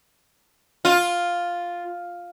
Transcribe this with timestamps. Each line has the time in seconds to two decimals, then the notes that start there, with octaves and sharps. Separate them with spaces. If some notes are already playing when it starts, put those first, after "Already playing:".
0.85 F4